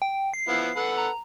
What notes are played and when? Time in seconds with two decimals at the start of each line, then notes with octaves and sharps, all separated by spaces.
0.02 G5
0.34 C7
0.49 F3 B3 E4
0.76 A4 B4 F#5
0.98 A#5